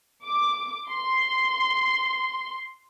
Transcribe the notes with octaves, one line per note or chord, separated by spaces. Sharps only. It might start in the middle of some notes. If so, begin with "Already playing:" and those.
D6
C6